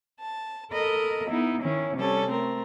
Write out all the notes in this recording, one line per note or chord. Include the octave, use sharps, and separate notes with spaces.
A5
A4 A#4 D#5 B5
B3 D#4 E4
D#3 C#4 E4
C3 G3 C#4 A4
A3 C4 A#4